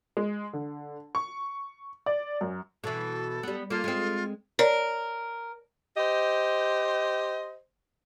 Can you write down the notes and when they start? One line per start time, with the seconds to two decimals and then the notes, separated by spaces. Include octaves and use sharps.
0.17 G#3
0.53 D3
1.15 C#6
2.06 D5
2.41 F#2
2.84 B2 E3 A4
3.43 G3 B3
3.70 A#3 F4 A4
3.84 G#3 C4
4.59 A#4 C#5 D5
5.97 G4 C5 D#5